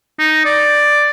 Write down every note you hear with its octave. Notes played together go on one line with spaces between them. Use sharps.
D#4
D5